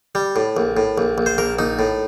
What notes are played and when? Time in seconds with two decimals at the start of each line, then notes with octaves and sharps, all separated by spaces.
0.15 G3
0.36 A2
0.57 A#1
0.77 A2
0.98 A#1
1.18 A#1
1.26 C5
1.38 A#1 A#4
1.59 A#1 D#4
1.79 A2